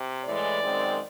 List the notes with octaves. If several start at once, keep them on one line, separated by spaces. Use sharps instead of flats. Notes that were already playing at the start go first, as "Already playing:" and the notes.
Already playing: C3
A2 E3 G#3 D5
F#2 D#3 G#3 C4